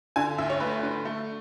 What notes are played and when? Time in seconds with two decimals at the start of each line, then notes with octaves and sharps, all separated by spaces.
0.16 D3 G#5
0.38 D2 E5
0.50 C#5
0.60 A3 B4
0.83 D3
1.05 A3